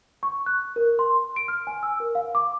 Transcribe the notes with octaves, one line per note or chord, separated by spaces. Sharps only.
C#6
F#6
A#4
C6
D7
F6
G#5
E6
A#4
F5
D6